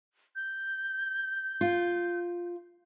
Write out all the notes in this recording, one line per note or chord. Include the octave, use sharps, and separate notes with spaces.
G6
F4